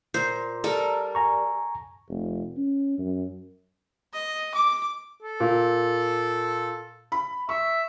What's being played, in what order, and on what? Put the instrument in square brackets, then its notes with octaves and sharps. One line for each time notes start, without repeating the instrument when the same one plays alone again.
[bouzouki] A#2 [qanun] C5
[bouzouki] G3 A#4 [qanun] A4
[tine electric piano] G#5 A#5 C#6
[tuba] F1
C#4
F#2
[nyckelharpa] D#5
D6
[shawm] A4
[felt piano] A#2
B5
[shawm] E5 [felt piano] C#6